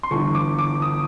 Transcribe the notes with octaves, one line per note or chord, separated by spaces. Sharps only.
C6
G1 G2 E3 C#6
D6
D6
D#6